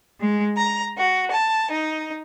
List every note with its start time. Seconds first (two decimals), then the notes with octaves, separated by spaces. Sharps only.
0.20 G#3
0.57 A#5
0.98 F#4
1.31 A5
1.71 D#4